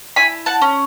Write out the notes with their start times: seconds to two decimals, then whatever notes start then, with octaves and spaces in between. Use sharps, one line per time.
0.16 E4 G#5 B5
0.46 F#5 A5
0.62 C#4